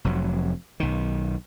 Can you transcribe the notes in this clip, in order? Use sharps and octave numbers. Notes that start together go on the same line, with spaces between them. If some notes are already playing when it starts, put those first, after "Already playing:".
F1 F2 F#3
B1 D#3